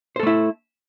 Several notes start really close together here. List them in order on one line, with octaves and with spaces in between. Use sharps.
C5 A4 A3 E4